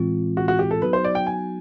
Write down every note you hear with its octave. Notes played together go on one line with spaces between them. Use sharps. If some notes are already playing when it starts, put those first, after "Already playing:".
Already playing: A2 E3 G#3 C4 F4
F#4
F#4
G4
A4
F#3 B3 D#4 F#4 B4
C5
D5
G5
G#5